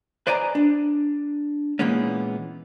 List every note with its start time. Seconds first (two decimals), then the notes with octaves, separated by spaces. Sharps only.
0.27 B4 C5 D5 D#5 G#5 A#5
0.55 D4
1.79 A#2 E3 G#3 A#3 B3 C#4